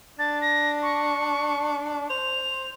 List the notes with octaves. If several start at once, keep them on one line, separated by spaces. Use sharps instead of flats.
D4 A6
A#6
C#6
C5 F7